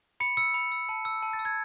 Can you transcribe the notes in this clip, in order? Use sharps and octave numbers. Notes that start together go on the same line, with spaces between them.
B5 C#7
E6 C#7
B5
E6
A5
E6
A5
A6
E6
G#6